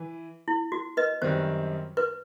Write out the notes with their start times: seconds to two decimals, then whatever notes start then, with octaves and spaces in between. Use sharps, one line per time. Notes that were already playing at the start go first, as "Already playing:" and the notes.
Already playing: E3
0.48 E4
0.72 F#4
0.97 B4 D#5
1.22 F#2 D#3 G3 C4 C5
1.97 B4